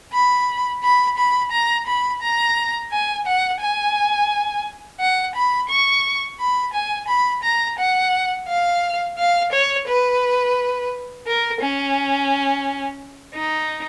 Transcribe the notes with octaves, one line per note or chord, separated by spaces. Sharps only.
B5
B5
B5
A#5
B5
A#5
G#5
F#5
G#5
F#5
B5
C#6
B5
G#5
B5
A#5
F#5
F5
F5
C#5
B4
A#4
C#4
D#4